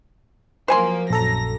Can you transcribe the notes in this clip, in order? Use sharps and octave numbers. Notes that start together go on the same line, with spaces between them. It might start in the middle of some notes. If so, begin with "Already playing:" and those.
F3 F#3 A#3 C5 G#5 C6
A#1 F#2 A4 A#5 A#6